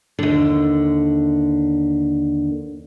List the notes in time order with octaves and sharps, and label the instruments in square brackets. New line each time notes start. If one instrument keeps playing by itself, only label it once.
[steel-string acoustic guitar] D#2 D3